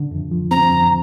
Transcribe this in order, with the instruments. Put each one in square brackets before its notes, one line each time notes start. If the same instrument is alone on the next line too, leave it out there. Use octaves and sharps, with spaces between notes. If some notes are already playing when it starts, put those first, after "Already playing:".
Already playing: [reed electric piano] D3
F2
F3
[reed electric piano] C4 [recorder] A#5
[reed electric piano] F2